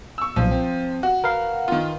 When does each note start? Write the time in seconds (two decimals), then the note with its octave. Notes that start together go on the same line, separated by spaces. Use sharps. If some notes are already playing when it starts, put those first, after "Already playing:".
0.18 C#6 E6
0.36 B1 A#2 F3
0.51 C4
1.03 F#4
1.24 A#4 B4 F5
1.68 D#3 F4